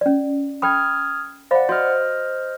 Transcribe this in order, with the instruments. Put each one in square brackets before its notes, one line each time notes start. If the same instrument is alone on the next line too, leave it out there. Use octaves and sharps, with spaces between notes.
[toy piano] C#4 D5
[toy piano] A4 G5 B5 [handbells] D#6 F6 G#6
[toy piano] C5 F5 B5 [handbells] D5 F#5
[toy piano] F#4 [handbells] C5 D#5 F6